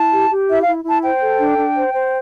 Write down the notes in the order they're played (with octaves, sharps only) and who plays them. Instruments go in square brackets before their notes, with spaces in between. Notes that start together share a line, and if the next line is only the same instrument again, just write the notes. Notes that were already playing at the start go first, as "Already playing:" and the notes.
Already playing: [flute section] E4 A5
G4
G4
E4 E5
E4 F5
E4 A5
C5 G5
A4
D4
D4
C5
C5